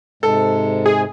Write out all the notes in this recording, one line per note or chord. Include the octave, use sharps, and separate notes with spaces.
G#2 C3 G#3 A4
G#4